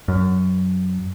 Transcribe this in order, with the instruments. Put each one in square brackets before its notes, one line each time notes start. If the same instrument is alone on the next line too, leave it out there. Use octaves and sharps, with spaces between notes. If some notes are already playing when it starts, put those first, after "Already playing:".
[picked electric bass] F#2